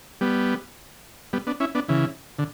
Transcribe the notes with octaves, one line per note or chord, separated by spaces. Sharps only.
G3 B3
G3 B3
B3 D4
C#4 E4
B3 D4
C#3 E3
D3